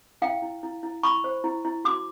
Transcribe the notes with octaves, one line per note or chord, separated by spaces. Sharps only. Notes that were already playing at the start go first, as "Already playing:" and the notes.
E4 F5 G5
E4
E4
E4
E4 B5 C#6
C5
E4
E4
F#4 C6 D6